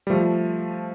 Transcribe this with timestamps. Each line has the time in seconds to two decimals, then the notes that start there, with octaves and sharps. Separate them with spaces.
0.07 G3
0.10 F3 A3